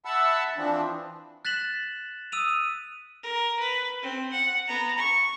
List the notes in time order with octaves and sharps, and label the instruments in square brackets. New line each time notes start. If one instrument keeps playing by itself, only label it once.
[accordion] E5 F#5 A5 B5 E6
E3 F3 C4 D4
[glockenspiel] F#6 A6 B6 E7 F#7
D#6 E6 D#7 F7
[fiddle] A#4
B4
C4
F#5
B3 A#5
C#6